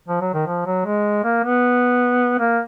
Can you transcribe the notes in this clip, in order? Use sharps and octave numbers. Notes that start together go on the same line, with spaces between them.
F3
F#3
D#3
F3
F#3
G#3
A#3
B3
A#3